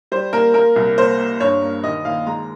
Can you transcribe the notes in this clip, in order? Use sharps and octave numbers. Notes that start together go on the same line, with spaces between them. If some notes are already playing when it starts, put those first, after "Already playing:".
G3 C5
A#3 A#4
A#3 A#4
C2
A#3 C5
A#3
G2 C#5
A#3
D#2 D#5
D#2 F5
G#3 A#5